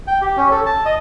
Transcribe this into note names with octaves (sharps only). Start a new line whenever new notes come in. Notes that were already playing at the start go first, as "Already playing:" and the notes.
G5
G4
C#4
A4
A5
D#5